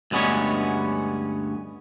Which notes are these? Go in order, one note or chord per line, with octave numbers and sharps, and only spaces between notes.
D2 G2 G#3 B3 C#4 C#5